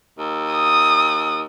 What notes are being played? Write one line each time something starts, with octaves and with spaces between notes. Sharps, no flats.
D#2
D#6